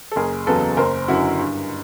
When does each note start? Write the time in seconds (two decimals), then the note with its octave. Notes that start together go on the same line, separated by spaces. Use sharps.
0.12 A4
0.16 F#1 G#4 A#4
0.47 E2 C#3 F#3 A4 B4
0.77 F#1 A#4 C5
1.08 F#2 D3 E4 F#4
1.39 G2